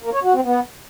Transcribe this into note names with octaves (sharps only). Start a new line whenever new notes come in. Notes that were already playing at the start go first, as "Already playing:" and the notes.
A#3
C#5
F#4
C4
B3